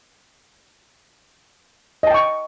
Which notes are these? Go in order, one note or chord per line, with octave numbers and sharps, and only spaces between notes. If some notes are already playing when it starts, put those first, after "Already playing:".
D#5 G5 A5 C#6